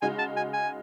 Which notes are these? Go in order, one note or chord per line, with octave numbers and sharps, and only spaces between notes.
C#3 G#3 D#4 F#4 G#5
A5
G#5
G#5